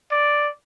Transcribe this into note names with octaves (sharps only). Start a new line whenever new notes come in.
D5